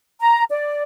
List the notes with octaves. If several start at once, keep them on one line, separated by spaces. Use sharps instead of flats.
A#5
D5